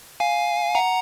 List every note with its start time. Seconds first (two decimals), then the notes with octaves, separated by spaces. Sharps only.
0.20 F5 G#5
0.75 F#5 A#5